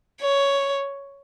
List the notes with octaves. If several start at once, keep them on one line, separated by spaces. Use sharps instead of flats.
C#5